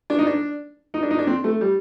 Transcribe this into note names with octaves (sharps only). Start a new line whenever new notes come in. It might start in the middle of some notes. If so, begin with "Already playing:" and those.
D4
D#4
D4
D#4
D4
D#4
D4
C4
A3
G3